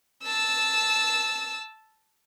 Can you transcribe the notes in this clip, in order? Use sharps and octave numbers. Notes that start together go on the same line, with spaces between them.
A5 E6